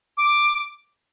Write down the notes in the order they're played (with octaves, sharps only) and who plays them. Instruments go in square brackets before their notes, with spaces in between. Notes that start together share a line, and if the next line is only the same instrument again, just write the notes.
[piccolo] D6